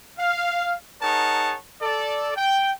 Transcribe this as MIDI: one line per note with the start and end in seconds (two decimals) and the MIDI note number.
0.19 0.75 77
1.02 1.56 63
1.02 1.56 68
1.02 1.56 70
1.02 1.56 73
1.02 1.56 78
1.02 1.56 81
1.82 2.32 69
1.82 2.32 74
2.36 2.71 79